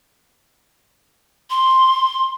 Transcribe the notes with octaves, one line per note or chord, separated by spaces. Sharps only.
C6